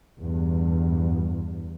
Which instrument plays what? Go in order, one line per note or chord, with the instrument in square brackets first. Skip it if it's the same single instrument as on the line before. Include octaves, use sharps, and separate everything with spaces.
[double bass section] E2 G2